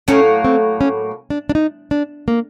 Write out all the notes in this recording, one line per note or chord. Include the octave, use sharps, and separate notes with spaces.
A2 F#3 A#3 C#4
C4
C#4
D4
D4
D#4
D4
A#3